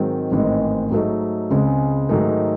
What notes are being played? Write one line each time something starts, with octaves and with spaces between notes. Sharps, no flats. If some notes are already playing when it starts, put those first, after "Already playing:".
Already playing: G#2 D#3 F#3 C4
A1 G#2 D#3 G#3 C4
G#2 F#3 A3 D#4
C#2 C#3 G#3 C4
G#2 D#3 F#3 A3 D#4